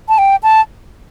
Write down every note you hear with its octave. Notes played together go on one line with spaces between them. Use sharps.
A5
G5
A5